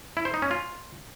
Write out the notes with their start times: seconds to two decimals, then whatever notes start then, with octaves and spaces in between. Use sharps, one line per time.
0.17 E4
0.25 C5
0.34 D#4
0.42 C#4
0.51 F4